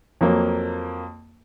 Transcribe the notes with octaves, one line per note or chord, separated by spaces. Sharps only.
F2 F#3 A#3